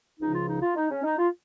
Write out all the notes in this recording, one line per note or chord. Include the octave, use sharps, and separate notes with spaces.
C#2 C#3 F3 D#4
F4
D#4
F4
D#4
C#4
D#4
F4